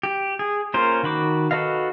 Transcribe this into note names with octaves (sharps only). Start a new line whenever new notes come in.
G4
G#4
A#3 C#4 F4 A#4 C5
D#3 F#4 B5 D6
F#4 A4 B4 D#5 F5